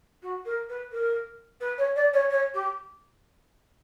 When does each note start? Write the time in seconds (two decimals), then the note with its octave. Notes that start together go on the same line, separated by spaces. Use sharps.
0.22 F#4
0.45 A#4
0.69 B4
0.92 A#4
1.60 B4
1.78 C#5
1.96 D5
2.13 C#5
2.30 C#5
2.54 G4